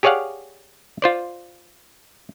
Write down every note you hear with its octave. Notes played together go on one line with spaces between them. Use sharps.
G4 G#4 C#5 D5 F5 F#5
F4 C5 D5